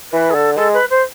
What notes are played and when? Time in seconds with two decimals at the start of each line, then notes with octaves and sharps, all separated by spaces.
0.12 E3 B4
0.30 G#4
0.34 D3 A4
0.56 G#3 A4
0.74 B4
0.90 C5